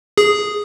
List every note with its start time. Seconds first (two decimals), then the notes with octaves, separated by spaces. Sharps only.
0.18 G#4